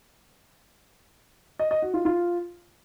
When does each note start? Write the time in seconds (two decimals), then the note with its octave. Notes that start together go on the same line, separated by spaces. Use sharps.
1.59 D#5
1.71 D#5
1.82 F#4
1.94 F4
2.05 F4